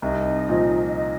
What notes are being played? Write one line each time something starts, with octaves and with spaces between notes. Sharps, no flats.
C2 D#4 D#5
A#2 F3
D#4 D#5